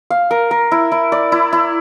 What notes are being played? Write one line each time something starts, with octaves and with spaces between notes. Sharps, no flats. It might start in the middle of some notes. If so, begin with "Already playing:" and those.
F5
A#4
A#4
E4
E4
D5
E4
E4